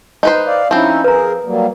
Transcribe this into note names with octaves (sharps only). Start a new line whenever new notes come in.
D#4 B4 C5
D5 F5
F3 C4 C#4 D#4 E4
G#4 A#4 B4 A#5
F#3 G3 A#3